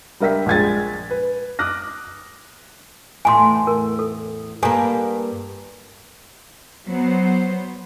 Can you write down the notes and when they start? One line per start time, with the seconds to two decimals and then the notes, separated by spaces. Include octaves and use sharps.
0.20 G3 D4 A#4 E5 G5 B6
0.46 A#1 G#3 G#6 A6
1.11 B4
1.59 D6 D#6 F6 F#6 A#6
3.25 E2 A2 G#5 B5 C6
3.67 A#4
3.99 A4
4.63 G2 A#3 A4 G#5
6.88 F#3 B3 C5